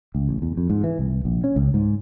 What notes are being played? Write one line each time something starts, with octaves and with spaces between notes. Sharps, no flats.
C#2
A1
E2
F2
G#2
E3
C2
A#1
C#4
C#2
G#2